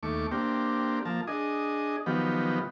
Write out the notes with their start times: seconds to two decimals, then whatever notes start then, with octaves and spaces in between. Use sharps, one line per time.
0.03 D#2 A3 C#6 D6
0.31 A#3 C4 D4 G4
1.05 F3 A#3 A5
1.27 D4 G#4 D#5
2.06 D#3 F3 F#3 B3 G4